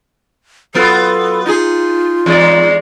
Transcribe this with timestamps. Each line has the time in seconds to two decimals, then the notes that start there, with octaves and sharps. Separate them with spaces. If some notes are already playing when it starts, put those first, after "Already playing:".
0.74 F#3 B3 F4 A4
1.46 D#4 F4 G#4
2.26 E2 G#3 D5